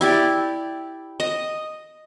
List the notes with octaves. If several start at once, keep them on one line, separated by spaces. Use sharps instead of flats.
E4 G4 D5
D#5